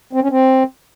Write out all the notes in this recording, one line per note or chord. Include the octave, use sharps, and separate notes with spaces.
C4
C#4
C4